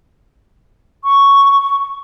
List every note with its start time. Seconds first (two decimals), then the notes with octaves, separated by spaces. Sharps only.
1.04 C#6